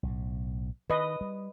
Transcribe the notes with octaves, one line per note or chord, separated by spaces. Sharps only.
B1 A2
D#3 B4 D#5
G3